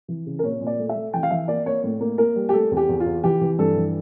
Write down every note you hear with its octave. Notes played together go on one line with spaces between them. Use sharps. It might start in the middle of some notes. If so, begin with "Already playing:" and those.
E3
C#3
A#4
A#2 C#5
A#2
D5
A3
E5
A3
E3 G5
F5
E3 E5
A#3 D5
A#3 C#5
A2
A#3
A#3 A#4
G3
G4
A3 A4
E2
G4
E2
F4
E2
E3 G4
E3
G2 A4
E3